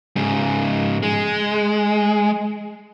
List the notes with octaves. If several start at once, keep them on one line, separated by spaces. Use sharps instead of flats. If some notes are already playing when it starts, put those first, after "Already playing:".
G#2 C#3
G#3